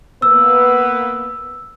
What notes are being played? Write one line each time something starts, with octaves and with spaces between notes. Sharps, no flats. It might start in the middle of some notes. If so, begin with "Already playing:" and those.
A#3 B3 B4 E6